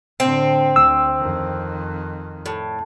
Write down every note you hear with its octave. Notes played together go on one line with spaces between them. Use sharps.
A2 D3 C4
D2 E6
F2 D#3
A2